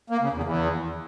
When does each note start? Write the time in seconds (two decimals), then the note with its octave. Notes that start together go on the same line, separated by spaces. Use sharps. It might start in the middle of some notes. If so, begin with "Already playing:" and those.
0.10 A#3
0.21 C#3
0.32 E2
0.43 E2